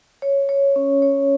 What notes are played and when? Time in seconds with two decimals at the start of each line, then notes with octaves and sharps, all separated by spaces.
0.22 C#5
0.49 C#5
0.76 C#4
1.02 C#5